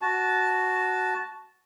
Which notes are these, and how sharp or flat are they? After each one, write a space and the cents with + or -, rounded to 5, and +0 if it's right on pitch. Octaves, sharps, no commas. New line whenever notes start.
F#4 +0 A5 -15